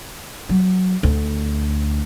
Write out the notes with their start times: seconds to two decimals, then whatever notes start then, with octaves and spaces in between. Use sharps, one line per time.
0.49 F#3
1.03 D2